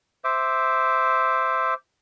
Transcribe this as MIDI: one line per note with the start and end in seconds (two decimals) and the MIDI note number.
0.24 1.74 72
0.24 1.74 76
0.24 1.74 86